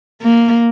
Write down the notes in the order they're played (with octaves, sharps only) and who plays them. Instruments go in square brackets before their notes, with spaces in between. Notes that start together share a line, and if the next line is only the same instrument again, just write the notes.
[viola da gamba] A#3